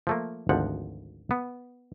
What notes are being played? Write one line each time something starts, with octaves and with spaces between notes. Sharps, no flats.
F3 A3 A#3
G#1 D2 F3 F#5
B3